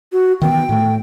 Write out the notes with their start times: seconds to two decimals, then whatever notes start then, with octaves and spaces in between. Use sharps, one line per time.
0.12 F#4
0.42 D#3 E3 B3 G5
0.69 A2 A3